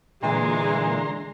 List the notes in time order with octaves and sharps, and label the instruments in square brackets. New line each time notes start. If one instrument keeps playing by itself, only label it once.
[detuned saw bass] A#2 [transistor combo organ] D3 A#5 C6 [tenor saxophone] E3 [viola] G#3